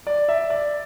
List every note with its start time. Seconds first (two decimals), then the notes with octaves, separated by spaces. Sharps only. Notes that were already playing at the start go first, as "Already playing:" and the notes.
0.07 D5
0.29 E5
0.50 D5